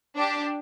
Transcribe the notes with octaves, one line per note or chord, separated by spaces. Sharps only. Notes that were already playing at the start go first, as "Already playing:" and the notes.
D4 G4